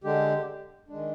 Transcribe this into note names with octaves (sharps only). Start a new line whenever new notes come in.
D3 G#3 D4 G4
D#3 G#3 D4